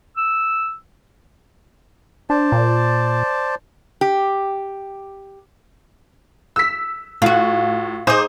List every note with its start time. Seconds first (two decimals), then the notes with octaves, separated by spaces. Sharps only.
0.17 E6
2.30 D4 C5 D5 A5
2.52 A#2
4.01 G4
6.56 E6 B6
7.22 A2 F4 F#4
8.07 D#4 G#4 C5 D6 D#6